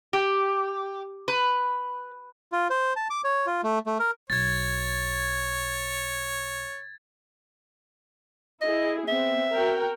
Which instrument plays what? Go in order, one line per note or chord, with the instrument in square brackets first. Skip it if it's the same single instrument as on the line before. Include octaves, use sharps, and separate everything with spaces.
[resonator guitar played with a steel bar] G4
B4
[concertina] F4
C5
A5
D6
C#5
F4
A3
A3
A#4
[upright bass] B1 [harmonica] C#5 [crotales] G#6 A6
[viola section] E4 G#4 [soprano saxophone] D#5
[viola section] B3 C4 [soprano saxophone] E5
[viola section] F#4 A#4 G5